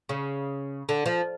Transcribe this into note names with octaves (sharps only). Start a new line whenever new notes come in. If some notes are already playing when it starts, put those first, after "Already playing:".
C#3
D3
F3